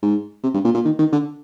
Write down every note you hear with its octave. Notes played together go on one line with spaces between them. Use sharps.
G#2
C3
G2
A#2
A#2
D#3
D#3
D3